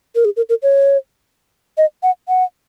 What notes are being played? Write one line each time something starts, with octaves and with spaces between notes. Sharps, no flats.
A#4
G#4
A#4
A#4
C#5
D#5
F#5
F#5